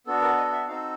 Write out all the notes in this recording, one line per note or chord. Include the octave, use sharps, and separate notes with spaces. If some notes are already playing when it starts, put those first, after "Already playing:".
B3 D4 F#4 A4
A#4
D#5
E5
C4 D#4 F#4 A4 F5